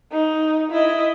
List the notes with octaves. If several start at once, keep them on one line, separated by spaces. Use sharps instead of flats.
D#4
E4 D#5